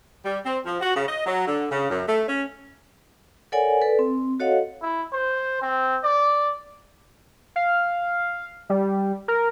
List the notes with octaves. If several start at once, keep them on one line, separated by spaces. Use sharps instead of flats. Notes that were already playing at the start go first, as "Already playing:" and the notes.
G3
C4
F3
F#4
C#3
D#5
F#3
D3
C#3
F#2
A3
C#4
A4 A#4 C#5 D5 F#5 G#5
A4 B4 D5
C4
F#4 A4 C#5 D#5 F5 F#5
E4
C5
C4
D5
F5
G3
A#4